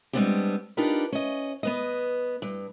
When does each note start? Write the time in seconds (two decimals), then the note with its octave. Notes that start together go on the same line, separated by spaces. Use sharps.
0.13 G3 G#3 B3 C4 D4 G4
0.77 D4 D#4 F4 G4 A#4 B4
1.12 C#4 D#5
1.63 B3 B4 D#5
2.42 G2